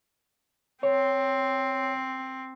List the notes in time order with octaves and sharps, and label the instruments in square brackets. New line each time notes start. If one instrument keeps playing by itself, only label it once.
[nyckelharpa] C4 [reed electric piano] C#5